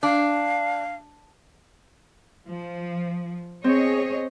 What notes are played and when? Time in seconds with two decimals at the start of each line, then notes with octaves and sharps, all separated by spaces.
0.03 D4 F5
2.46 F3
3.64 C4 G#4 C#5 D#5